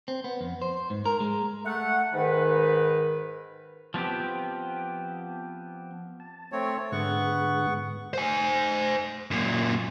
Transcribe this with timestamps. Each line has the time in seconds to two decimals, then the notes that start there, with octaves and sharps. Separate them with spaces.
0.08 C4
0.24 B3
0.41 F2
0.62 C5
0.90 G#2
1.06 A#4
1.20 G#3
1.65 A3 F#5
2.14 G#2 D#3 B4
3.94 F3 B3 C4 G4
6.20 A5
6.52 A3 C4 C#5
6.92 G#2 D3 G#3 B3 F#5 C#6
8.13 C5 G#5
9.31 F#2 A#2